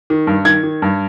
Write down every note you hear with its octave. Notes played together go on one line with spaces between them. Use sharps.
D#3
G2
D#3 G#6
D#3
G2